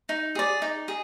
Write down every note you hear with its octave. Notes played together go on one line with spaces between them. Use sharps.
D#4
G#4 D5
D#4
G#4